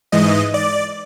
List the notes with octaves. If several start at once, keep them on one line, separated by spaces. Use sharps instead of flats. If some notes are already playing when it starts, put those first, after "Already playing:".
G#2 E3 D#5
D5